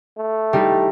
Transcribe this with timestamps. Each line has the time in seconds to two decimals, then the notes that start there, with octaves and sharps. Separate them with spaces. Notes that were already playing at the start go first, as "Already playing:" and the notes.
0.18 A3
0.53 G3 D#4 E4